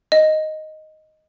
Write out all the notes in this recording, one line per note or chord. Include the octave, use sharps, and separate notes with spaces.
D#5